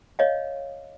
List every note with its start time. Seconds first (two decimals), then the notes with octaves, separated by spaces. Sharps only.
0.19 C#5 D#5 F5